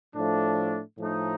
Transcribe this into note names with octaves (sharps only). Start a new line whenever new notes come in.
A2 F3 A3 D4
A2 F3 A3 D#4